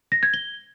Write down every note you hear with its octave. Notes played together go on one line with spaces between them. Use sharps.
A#6
G#6
G7